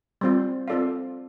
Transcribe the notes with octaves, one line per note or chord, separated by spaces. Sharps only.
G3 C4 F4
C4 F4 A4 D5 F5